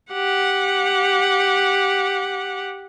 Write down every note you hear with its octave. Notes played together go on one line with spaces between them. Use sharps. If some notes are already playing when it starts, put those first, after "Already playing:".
G4 F#5